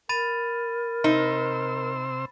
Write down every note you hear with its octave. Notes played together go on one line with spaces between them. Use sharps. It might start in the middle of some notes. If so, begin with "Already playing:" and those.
A#4 B5 A6 D#7
C3 D#4 C5 E6